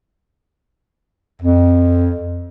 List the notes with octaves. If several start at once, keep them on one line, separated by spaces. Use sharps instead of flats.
F2